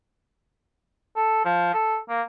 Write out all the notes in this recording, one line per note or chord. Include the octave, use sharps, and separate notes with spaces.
A4
F3
A4
A#3